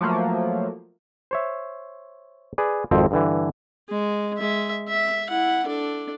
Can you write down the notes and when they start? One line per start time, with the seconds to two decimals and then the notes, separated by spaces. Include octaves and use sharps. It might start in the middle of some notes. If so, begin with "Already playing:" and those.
0.01 F3 F#3 A3 A#3
1.31 C5 C#5 E5
2.58 G#4 B4 D5
2.91 G#1 F2 C4
3.11 G2 D3 E3
3.90 G#3
4.38 G#3 E5
4.89 E5
5.29 E4 F#5
5.66 D4 A4